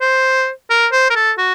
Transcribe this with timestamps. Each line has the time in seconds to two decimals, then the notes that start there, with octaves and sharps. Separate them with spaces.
0.01 C5
0.70 A#4
0.93 C5
1.10 A#4
1.16 A4
1.38 F#4